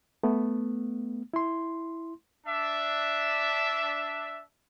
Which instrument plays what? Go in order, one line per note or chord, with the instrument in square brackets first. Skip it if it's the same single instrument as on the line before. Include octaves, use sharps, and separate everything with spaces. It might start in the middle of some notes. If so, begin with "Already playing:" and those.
[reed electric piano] A3 B3
E4 C6
[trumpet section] D4 E5